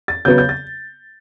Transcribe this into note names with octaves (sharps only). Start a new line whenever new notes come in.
A6
C#3 F#3 B3 G6
G6
A6